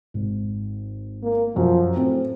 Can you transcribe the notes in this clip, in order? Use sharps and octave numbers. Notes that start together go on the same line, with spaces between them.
G#1
A#3
F#2 F3
A2 C4